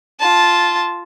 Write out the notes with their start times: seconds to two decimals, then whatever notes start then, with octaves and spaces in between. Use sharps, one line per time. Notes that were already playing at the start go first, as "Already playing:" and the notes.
0.20 F4 A5